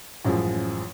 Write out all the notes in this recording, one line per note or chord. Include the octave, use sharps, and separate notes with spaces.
A1 F#2 F3 G#3